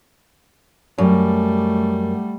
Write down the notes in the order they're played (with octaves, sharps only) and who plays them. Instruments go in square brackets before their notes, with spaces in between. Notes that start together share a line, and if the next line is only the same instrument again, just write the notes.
[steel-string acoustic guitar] F#2 [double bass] G3 A3